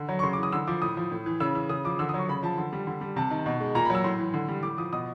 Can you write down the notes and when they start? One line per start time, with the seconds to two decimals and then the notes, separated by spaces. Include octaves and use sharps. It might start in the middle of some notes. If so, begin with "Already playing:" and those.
Already playing: D3
0.09 F#3
0.19 C#6
0.23 C#3 C6
0.33 D6
0.37 E3
0.43 D#6
0.52 D3 E6
0.67 F3 D6
0.82 A2 D#6
0.97 F3
1.12 A2
1.26 E3
1.40 C#3 E6
1.55 E3 E6
1.69 C#3 D#6
1.84 F3 D6
1.99 D3 E6
2.09 D#6
2.14 F#3 C#6
2.29 C#3 B5
2.43 F3 A5
2.58 D3
2.73 G3
2.87 D3
3.01 G3
3.16 C3 A5
3.31 D#3
3.46 B2
3.61 G#3
3.75 A#2 A#5
3.85 B5
3.90 F#3 E6
4.04 A2 C6
4.19 E3
4.34 D3
4.48 G3
4.63 A2 D6
4.78 F3 D#6
4.93 B2 D#6